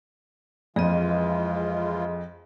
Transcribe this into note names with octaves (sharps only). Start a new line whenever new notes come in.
F2 E3 G#3 F4 G#4 D#5